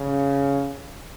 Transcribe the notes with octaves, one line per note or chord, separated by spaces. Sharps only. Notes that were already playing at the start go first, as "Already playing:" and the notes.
Already playing: C#3